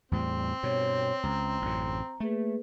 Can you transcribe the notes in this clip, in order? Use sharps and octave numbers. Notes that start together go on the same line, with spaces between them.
E2 A2 G3 C4
G2 B2 C#5 G5 C6
C#2 A#5
A1 F#2 A2
A3 A#3 G#4 B4